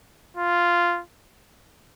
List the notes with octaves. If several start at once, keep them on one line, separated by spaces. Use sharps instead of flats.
F4